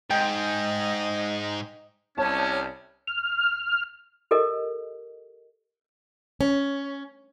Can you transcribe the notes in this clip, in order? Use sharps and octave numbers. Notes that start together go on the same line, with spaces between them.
G#2 D#5 G5
C2 C4 C#4 C#5 A5
F6
G4 A4 A#4 D#5
C#4